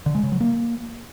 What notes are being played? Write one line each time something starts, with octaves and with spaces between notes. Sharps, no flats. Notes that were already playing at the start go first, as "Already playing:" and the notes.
D3
G#3
C#3
F#3
A#3